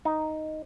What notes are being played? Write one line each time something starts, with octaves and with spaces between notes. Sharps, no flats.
D#4